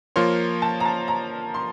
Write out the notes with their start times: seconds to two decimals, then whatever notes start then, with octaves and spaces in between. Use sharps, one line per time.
0.16 F3 A#3 F4 A#4 C#5 C6
0.62 A5
0.80 A#5
0.85 A5
1.08 A#5
1.54 C6